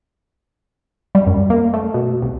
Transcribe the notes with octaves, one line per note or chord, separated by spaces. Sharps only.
G3
F#2
A#3
A3
B2
C2